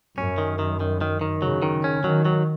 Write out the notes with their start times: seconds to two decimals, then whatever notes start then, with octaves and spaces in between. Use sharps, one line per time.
0.17 F#2 C#4
0.38 D#3
0.59 D#3
0.80 D#3
1.01 D#3
1.21 D#3
1.42 C#3 F#3
1.62 D#3
1.84 C#4
2.04 D#3 F#3
2.25 F#3